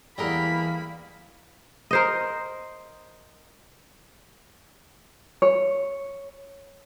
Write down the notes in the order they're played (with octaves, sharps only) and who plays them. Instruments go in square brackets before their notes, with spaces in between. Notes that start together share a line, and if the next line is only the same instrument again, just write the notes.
[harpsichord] E2 G#3 A#5 [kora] G3 G#4 A#4 [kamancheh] A#3 B5
[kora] A#4 C5 D#5
[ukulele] C#5